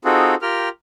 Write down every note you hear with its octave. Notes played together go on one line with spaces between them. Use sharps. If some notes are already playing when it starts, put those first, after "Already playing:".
C4 D#4 F4 F#4 G#4 A4
F4 G4 A#4 G5 F6